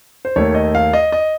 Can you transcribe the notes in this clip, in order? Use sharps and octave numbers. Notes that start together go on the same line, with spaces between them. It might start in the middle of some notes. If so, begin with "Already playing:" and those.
C5
D#2 D#3 A3 C#5
D#5
F5
D#5
D#5